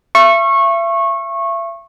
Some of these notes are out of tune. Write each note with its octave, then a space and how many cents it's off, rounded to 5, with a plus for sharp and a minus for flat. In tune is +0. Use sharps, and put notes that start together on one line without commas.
E5 +40 C#6 -20